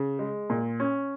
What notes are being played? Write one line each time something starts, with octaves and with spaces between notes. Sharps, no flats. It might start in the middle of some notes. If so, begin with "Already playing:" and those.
Already playing: C#3
G#3
A#2
C#4